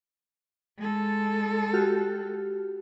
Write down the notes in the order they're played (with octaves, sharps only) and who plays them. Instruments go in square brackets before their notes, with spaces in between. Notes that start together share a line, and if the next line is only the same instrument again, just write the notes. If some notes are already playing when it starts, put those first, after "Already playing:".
[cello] G#3 A4
[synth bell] F#4 G4 F6